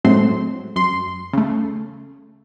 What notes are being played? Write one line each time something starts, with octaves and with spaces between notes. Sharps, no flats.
A2 F#3 G#3 A3 C4 C6
F#2 C6
C#3 A3